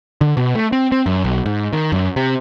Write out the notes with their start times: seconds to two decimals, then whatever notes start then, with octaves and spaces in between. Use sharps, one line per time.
0.21 D3
0.37 B2
0.55 A3
0.72 C4
0.92 C4
1.06 F#2
1.24 B1
1.46 G#2
1.73 D#3
1.92 F#2
2.16 C3